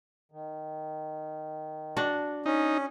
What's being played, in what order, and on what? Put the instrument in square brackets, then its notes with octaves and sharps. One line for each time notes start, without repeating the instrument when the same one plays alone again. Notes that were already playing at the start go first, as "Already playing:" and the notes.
[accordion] D#3
[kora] D4 F#4
[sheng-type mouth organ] C#4 [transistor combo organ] D#4